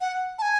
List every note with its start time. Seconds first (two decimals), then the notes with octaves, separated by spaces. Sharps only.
0.01 F#5
0.38 A5
0.42 G#5